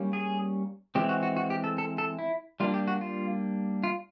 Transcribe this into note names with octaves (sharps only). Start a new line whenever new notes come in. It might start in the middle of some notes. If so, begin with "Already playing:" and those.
Already playing: G3 A#3 C#4
G#4
E3 G#3 C4 G4
F#4
F#4
F#4
G4
A4
A4
A4
E4
G3 A#3 D4 F4
G4
F#4
F4
F4